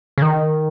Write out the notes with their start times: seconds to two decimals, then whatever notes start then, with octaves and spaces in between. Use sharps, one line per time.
0.18 C#3
0.22 D#3